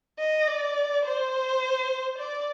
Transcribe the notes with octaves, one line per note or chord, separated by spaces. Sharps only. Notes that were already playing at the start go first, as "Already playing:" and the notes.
D#5
D5
C5
D5